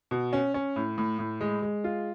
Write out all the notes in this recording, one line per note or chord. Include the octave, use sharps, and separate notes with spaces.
B2
C#4
C#4
A2
A2
A2
G#3
G#3
F4